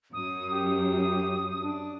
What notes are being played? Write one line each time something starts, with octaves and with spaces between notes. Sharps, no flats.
F#2 D#6
G4 D#6
D4